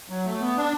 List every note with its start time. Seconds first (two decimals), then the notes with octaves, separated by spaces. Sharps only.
0.09 F#3
0.26 A3
0.41 B3
0.56 D4